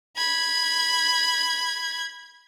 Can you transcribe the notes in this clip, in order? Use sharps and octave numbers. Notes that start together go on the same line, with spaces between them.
B5 G#6